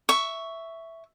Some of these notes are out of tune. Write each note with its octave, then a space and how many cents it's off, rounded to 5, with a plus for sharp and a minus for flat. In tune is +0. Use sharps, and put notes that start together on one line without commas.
E5 +0 C#6 +10